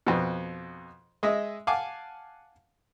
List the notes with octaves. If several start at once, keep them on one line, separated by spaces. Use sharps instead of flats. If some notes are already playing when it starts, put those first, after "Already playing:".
F2 B2
G#3 D#5 E5
F5 F#5 G#5 A5 D6